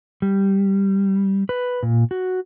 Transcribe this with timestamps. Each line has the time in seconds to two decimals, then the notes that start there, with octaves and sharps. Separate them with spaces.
0.22 G3
1.49 B4
1.83 A#2
2.11 F#4